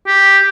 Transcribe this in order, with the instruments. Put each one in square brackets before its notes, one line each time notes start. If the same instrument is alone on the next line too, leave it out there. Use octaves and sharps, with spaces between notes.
[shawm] G4